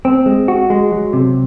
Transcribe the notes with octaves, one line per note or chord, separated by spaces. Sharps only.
C4
G#3
F#4
G#3
F#3
C3